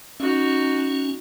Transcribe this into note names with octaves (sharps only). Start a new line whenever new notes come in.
C#4 D#4 F#4